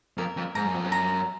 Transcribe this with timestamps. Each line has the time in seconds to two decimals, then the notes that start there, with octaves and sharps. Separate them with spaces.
0.18 F2 A#4
0.37 F2
0.55 G#2 A#5
0.65 F#2
0.74 F2
0.84 F#2
0.92 A#5